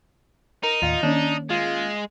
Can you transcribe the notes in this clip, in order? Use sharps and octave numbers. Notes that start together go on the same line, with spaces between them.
D#4 A#4
D#2 A2 F4
D#3 A#3 C#4 D4
G#3 F4